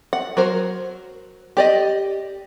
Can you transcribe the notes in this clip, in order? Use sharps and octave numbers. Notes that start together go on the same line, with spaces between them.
F#5
F#3 A#4 C5
G4 D5 D#5